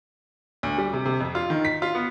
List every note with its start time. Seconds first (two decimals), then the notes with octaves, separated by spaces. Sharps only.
0.63 D2
0.78 G3
0.93 C3
1.05 C3
1.20 F2
1.35 F4
1.50 D#3
1.65 B6
1.82 F4
1.95 B3